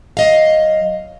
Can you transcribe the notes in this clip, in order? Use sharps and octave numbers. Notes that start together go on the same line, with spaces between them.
F#3 D#5 F5